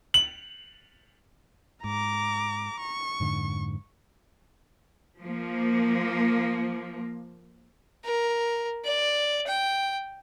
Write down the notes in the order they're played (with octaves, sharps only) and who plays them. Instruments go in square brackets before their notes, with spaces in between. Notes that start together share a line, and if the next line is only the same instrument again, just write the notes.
[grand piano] F#7
[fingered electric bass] G#2 [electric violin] A#5 D6
[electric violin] C#6
[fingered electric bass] F2 G#2 D3
[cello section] F3 A#3
[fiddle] A#4
D5
G5